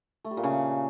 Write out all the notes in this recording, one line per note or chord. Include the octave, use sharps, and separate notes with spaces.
A3
G3
A#2
C#3